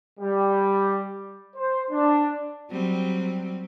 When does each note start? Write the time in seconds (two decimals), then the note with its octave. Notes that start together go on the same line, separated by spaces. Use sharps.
0.19 G3
1.56 C5
1.90 D4
2.71 F#3 G3 C4